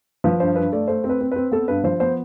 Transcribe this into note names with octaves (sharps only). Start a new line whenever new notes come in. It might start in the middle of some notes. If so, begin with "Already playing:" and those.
F3 B4
G2 C5
G2 B4
A3 D5
A3 C5
C4
B4
C4
C4 B4
B3 A4
G2 B4
F3 C5
B3 C5